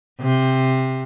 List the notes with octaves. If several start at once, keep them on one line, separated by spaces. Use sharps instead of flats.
C3